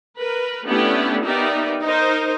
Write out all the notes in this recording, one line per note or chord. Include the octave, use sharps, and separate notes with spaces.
A#4 B4
A3 B3 C#4 D4 E4 G4
B3 D#4 G4 A#4 D5 E5
D#4 A#4 C5